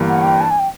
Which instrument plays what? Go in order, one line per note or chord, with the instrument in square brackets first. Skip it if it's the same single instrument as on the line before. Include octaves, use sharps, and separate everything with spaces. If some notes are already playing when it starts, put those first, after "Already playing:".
Already playing: [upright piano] G1 G2 E3 G3 A#3
[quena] F#5
G5
A5
G#5
G5